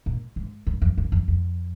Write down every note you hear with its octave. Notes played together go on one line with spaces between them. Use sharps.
A#2
G#2
G2
F2
G2
F2
F2